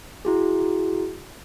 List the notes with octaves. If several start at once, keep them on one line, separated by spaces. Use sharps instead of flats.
E4 F#4 G#4